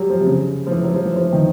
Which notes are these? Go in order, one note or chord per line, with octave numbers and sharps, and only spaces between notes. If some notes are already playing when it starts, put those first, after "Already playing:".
Already playing: F#3 G3
F3
C3
C#3
F3
E3
F#3
F3
E3
F3
E3
D#3